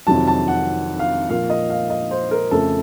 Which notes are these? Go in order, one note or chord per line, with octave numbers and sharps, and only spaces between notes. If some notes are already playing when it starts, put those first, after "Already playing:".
F2 C3 D#3 F#3 A5
A5
F#5
F5
A#2 F3 A#3 F5
D#5
F5
D#5
C5
A#4
F2 C#3 A3 A4